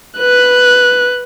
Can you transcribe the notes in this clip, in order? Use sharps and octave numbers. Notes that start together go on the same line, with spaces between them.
B4 F#6